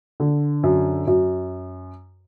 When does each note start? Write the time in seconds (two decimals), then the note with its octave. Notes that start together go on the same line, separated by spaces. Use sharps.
0.20 D3
0.63 F#2
1.07 F#2